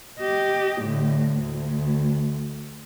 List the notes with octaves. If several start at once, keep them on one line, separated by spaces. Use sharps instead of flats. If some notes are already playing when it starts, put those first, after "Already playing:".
G4 D#5
A2 D3
D2